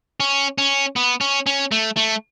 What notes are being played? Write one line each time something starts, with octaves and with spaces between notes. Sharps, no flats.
C#4
C#4
B3
C#4
C#4
A3
A3